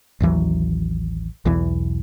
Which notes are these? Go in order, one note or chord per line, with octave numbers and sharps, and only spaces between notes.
A1 D#2 E3 F#3
B1 E2 E3